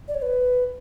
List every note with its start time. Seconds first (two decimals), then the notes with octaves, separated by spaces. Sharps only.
0.08 D5
0.15 C#5
0.22 B4